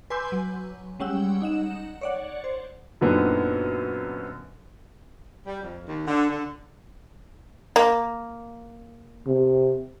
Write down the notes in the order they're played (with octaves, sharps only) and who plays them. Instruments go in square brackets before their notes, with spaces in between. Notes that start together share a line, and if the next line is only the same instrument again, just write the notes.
[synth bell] B4 G#5 C6 D6 E6 G6
F#3
G3 G#3 C#4 F#5 G5 E6
D#4 F#5 E7
C#5 D5 F#5
C5
[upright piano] F#2 A#2 D3 B3 C4 D#4
[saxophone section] G3
F2
D#2
D3
D3
[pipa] A#3
[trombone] C3